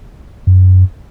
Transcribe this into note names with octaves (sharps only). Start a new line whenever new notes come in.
F#2